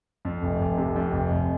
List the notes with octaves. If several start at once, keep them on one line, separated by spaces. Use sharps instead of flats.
F2
F1
F1
C3
F2
F1
F1